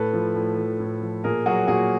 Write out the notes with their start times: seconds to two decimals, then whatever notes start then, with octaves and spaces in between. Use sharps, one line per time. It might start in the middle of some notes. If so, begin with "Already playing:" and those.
Already playing: A2 A4 B4
0.13 F3
0.35 A2
0.58 F3
0.80 A2
1.02 F3
1.24 A#2 G#4 A#4
1.46 F#3 F#4 G#4
1.68 A#2 F#4 G#4